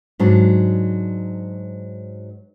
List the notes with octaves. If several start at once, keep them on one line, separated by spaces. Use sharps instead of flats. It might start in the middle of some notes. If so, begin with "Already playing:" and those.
G#2 F#3 D4